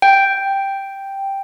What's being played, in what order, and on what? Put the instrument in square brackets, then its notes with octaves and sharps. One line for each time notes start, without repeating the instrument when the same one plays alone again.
[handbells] G5